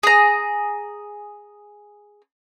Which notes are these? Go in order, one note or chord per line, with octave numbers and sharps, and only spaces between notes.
G#4 A#5